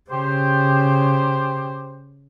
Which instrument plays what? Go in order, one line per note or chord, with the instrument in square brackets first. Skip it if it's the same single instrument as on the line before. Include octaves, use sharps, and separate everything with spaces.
[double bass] C#3 [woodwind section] G4 C5